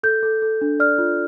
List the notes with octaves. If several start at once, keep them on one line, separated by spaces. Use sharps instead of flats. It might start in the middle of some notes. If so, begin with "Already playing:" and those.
A4 G6
A4
A4
D4
D5 F6
F4